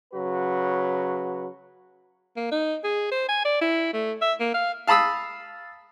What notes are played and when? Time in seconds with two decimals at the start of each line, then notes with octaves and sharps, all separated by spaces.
0.13 C#3 F#3 F#4 B4
2.36 A#3
2.51 D#4
2.84 G#4
3.11 C5
3.28 G#5
3.45 D5
3.61 E4
3.93 A3
4.21 E5
4.40 A#3
4.54 F5
4.87 F5 A5 B5 D#6 E6